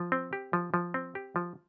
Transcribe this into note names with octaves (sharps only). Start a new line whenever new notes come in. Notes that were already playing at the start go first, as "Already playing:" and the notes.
Already playing: F3
C4
G4
F3
F3
C4
G4
F3